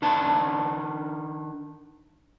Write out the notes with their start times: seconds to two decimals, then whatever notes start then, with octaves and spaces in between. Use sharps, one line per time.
0.02 D#3 D4 B4 A5